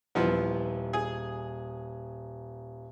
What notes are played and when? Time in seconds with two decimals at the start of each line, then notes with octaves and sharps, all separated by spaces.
0.15 D#1 E3 F3 B3
0.93 G#4